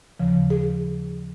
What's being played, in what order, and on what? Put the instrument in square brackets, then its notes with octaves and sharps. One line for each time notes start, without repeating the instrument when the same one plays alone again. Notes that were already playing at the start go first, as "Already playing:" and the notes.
[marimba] D#2 C#3 F3
G#4